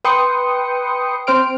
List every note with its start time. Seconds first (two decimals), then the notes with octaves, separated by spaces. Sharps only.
0.04 B4 G5 C6 D#6 C#7
1.27 C4 C5 F6 D7